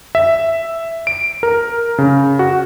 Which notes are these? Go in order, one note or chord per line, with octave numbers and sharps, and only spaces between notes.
E5
D7
A#4
C#3
F#4